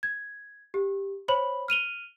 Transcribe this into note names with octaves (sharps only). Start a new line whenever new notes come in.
G#6
G4
C5 C#5 B5 F#7
F6 D#7 F7 G7